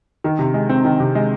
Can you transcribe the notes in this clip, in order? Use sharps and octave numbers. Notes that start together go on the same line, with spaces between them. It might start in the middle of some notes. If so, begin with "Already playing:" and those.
D#3
C3
G#3
C4
D#3
C3
G#3